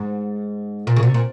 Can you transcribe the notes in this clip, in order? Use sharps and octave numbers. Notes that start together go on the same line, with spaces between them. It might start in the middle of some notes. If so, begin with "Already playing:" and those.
Already playing: G#2
A#2
C#3
C3
A#2